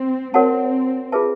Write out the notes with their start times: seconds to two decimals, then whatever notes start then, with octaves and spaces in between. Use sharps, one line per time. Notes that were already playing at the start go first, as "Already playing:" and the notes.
Already playing: C4
0.34 C4 F#4 A#4 C#5 F#5 A5
1.12 F4 G#4 B4 E5 A5